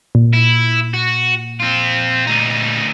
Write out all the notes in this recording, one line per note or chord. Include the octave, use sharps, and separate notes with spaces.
A#2
E4
F#4
C4 F4
D2 D#4